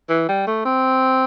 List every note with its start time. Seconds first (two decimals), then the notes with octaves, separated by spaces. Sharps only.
0.10 E3
0.29 G3
0.47 A3
0.65 C4